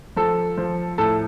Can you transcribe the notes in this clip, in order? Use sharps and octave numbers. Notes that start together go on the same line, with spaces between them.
F3 A4
F3
A2 A4